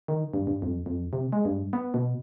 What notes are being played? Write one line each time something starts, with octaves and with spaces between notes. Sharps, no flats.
D#3
G2
G2
F2
F2
C3
G#3
G2
B3
B2